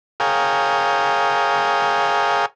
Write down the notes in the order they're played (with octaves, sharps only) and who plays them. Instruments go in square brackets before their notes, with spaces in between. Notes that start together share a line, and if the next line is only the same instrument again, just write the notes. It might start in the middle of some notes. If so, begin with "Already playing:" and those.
[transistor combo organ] G#4 A#4 C#5 F5 G5 D#6